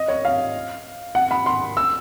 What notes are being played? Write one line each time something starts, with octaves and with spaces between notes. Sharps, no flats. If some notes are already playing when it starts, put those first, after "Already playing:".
Already playing: D#5
C#5
F5
F#5
B5
C6
E6